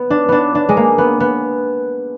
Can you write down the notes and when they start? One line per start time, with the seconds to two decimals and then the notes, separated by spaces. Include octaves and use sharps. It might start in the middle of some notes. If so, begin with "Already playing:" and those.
Already playing: B3
0.10 D4
0.28 B3 D4
0.55 D4
0.69 G#3
0.77 A#3
0.98 B3
1.20 B3